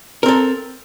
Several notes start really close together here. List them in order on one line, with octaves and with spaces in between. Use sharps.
A#4 C4 A4